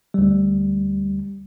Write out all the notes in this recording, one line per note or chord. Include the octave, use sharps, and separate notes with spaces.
D2 G3